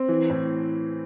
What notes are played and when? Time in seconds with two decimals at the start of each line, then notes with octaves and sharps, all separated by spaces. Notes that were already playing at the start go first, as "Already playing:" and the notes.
Already playing: C4
0.09 E3
0.30 A2